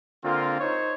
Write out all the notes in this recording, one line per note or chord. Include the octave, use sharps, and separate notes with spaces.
D3 A#3 C4 F4
D#4 C5 C#5